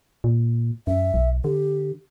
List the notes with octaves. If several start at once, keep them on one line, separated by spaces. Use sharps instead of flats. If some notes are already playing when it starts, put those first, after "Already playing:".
A#2
F#2 E5
B1
D3 G4